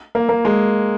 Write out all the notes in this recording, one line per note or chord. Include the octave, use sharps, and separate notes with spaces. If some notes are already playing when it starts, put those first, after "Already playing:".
A#3
A#3
G#3